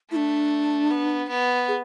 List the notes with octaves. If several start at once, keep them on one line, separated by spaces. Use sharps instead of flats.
A3 D4 E4
B3
B3
G#4